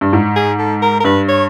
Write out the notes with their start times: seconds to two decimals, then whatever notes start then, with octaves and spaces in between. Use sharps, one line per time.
0.01 G2
0.13 G#2
0.36 G#4
0.59 A4
0.82 A#4
1.00 A#4
1.04 G2 B4
1.28 C#5